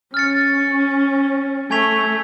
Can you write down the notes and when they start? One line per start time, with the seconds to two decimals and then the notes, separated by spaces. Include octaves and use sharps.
0.14 C#4 F6 A6 C#7
1.70 A3 G#5 C#6 G#6 B6 F7